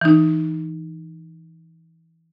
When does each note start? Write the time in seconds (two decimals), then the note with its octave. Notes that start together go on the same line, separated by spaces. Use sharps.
0.01 E3 D#4